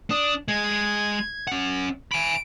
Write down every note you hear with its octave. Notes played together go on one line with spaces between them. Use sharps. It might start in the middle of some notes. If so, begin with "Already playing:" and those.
D4 D#6
G#3 G#4 G#6
C#4 F#5
G#5 B5 D7